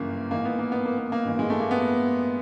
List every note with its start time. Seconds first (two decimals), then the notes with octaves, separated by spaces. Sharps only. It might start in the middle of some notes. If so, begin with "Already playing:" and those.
Already playing: G1 F#2 C#3 E3 A#3
0.31 A1 G#2 E3 A#3
0.45 B3
0.59 A#3
0.72 B3
0.85 A#3
0.98 B3
1.12 A#3
1.25 A1 G2 E3
1.39 G#3
1.50 A3
1.60 A#3
1.71 B3